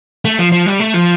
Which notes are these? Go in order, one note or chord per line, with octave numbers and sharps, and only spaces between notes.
A3
F3
F3
G3
A3
F3